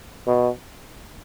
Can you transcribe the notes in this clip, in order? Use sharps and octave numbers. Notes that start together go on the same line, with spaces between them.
B2